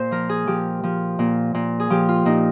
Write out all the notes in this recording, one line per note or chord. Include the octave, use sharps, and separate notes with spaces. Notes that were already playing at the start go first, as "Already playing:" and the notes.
Already playing: A#2 C5
F3 A#4
G#4
F3 G4
F3
A#2
A#2
G#4
F3 G4
F4
A#2 D#4